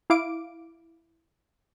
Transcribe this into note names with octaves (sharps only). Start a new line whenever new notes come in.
E4 F5 D6 D7